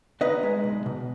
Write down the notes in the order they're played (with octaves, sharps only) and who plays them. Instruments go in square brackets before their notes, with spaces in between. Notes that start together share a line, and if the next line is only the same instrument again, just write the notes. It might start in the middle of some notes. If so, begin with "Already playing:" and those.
[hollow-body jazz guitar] D#4 B4 D#5
G#3
B1
B2